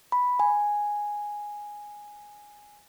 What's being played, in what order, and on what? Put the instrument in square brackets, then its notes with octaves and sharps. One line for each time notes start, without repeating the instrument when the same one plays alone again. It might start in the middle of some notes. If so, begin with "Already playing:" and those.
[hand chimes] B5
G#5